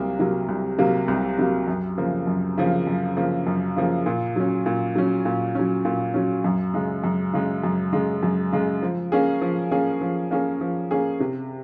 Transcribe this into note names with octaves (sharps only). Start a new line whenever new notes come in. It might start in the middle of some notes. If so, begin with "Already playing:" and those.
Already playing: C2 C3 F#3 A#3
C3 F#3 A#3
C2
C3 F#3 A#3
C2
C3 F#3 A#3
F#2
C#3 F3 A#3
F#2
C#3 F3 A#3
F#2
C#3 F3 A#3
F#2
C#3 F3 A#3
A#2
F#3 C#4
A#2
F#3 C#4
A#2
F#3 C#4
A#2
F#3 C#4
F#2
C#3 G#3
F#2
C#3 G#3
F#2
C#3 G#3
F#2
C#3 G#3
F3
A#3 C#4 G#4
F3
A#3 C#4 G#4
F3
A#3 C#4 G#4
F3
A#3 C#4 G#4
C3